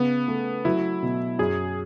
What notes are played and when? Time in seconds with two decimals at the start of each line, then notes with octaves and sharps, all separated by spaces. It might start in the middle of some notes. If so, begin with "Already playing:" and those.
Already playing: C#3 B3
0.28 A3
0.65 F#3 E4
1.03 B2
1.39 F#2 G#4